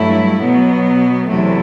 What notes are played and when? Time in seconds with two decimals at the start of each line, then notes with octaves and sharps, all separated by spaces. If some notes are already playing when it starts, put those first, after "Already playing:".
Already playing: G2 F#3 A3 E4
0.41 B2 F#3 B3
1.28 E2 C3 F#3 A3 E4